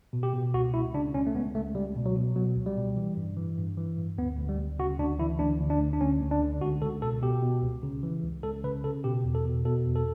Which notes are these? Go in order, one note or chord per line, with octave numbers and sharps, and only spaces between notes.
B2
G4
B2
C#2 F#4
C#2 E4
C#3 D4
C#2 C#4
A3
C#2 B3
C#2 A3
C#2 G3
B2
F#3
B2
B2 F#3
C#2
G3
B2
E3
G2
E3
G2
E3
G2
D2 B3
D2
G3
D2
C#3 F#4
D2 D4
E3 E4
D2 D4
D2
D4
D2
D4
D2 C#4
D2
D4
D3
C#2 F#4
C#2 A4
B2 A4
B2 G4
B2
C#2
C#3
E3
C#2
C#2 A4
C#3 B4
C#3 A4
B2 G4
E2
A4
B2
B2 A4
E2
A4